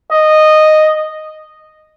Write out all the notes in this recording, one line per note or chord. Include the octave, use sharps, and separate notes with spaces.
D#5